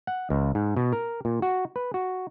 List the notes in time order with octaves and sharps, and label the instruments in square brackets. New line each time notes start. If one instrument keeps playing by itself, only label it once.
[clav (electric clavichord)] F#5
C#2
G#2
B2
A#4
A#2
F#4
B4
F#4